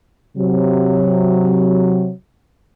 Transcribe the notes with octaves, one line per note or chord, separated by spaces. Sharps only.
C3 F#3